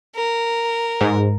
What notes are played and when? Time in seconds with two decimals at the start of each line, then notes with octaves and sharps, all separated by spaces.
0.16 A#4
1.01 G#2